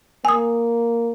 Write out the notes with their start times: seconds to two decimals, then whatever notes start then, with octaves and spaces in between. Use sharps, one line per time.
0.25 A#3 G#5 D#6